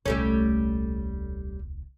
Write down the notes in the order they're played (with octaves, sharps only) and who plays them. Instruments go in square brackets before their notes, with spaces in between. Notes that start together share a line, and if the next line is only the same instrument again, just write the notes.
[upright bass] D#1 C2 [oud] G3 A3 C#4